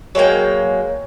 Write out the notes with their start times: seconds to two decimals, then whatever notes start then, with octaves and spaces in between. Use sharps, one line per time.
0.15 F#3 G#3 A#3 G5